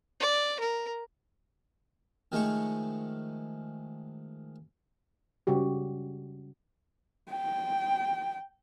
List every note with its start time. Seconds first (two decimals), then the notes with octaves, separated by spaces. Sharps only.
0.20 D5
0.60 A#4
2.32 D#3 F3 G#3 A3 C#5 C#6
5.47 C#3 G3 F#4 G4
7.32 G5